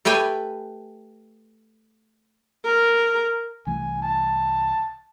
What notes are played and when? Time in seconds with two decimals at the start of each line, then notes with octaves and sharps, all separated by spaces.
0.05 A3 G4 B4 G5 G#5
2.65 A#4
3.67 C2 E3 A3 G#5
4.02 A5